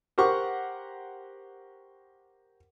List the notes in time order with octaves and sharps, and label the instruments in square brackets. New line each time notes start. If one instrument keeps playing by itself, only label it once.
[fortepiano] G4 A#4 C5 F#5 C#6